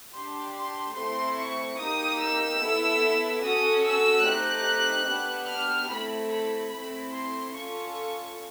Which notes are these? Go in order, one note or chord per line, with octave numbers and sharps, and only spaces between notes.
D4 G4 C6
C6
A3 C4 E4 C6
C#6
A#3 D#4 G4 D#6
E6
B3 E4 A4
C#4 F#4 A4 D#6
E6
A3 C4 D#4 G4 F#6
B3 D4 G4
F6
A3 C4 E4 A4 B5
B5
A3 C4 E4 B5
C6
C#4 F4 A4 C#6